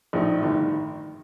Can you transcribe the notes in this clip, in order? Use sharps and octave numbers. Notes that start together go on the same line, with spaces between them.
A#1 A2 A3 D#4
G1 G2 D#3